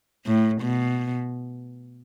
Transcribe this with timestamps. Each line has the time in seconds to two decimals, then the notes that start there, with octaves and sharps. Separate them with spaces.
0.26 A2
0.62 B2